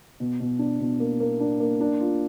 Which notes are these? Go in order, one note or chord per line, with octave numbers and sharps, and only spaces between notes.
B2
B2
D4
B2
A#3
A#3
D4
A#3
D4
F4